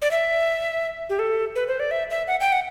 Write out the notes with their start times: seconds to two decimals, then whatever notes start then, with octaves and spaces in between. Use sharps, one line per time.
0.02 D5
0.11 E5
1.10 G4
1.19 A4
1.56 B4
1.68 C5
1.80 D5
1.91 E5
2.10 E5
2.28 F#5
2.40 G5
2.52 F#5